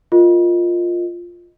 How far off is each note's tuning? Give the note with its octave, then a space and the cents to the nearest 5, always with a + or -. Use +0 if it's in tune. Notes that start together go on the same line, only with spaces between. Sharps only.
F4 +5 A#4 +0 D#5 +0